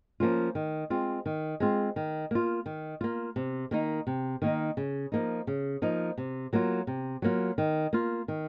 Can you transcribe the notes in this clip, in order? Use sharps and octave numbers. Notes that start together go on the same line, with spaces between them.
F3 A#3 C#4 F4
D#3
G#3 C4 F4
D#3
G#3 C4 F4
D#3
A#3 F4
D#3
A#3 F4
C3
D#3 A#3 D#4
C3
D#3 A#3 D#4
C#3
F3 A#3 D#4
C#3
F3 A#3 D#4
C3
F#3 A#3 F4
C3
F#3 A#3 F4
D#3
A#3 F4
D#3